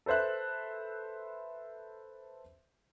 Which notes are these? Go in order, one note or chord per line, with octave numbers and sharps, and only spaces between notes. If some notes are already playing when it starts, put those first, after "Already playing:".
A4 B4 C5 E5 F#6